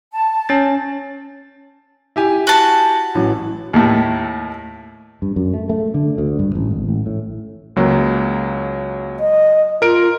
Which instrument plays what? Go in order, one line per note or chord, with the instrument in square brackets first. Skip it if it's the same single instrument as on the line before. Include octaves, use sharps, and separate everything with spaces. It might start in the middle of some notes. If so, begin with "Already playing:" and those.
[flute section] A5
[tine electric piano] C#4 A6
[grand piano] E4 G4 G#5
[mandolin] F#4 A5
[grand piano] A1 E3 F#3
[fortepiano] D#2 A2
[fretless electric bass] G2
F#2
A3
A3
D3
D2
G2
A1
G#1
A1
A2
[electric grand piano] C#2 F#3 A#3
[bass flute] D#5
[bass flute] F4 [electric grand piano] A#4 D7